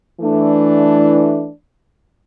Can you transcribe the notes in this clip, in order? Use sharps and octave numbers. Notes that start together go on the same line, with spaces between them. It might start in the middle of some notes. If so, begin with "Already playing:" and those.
E3 A3 D4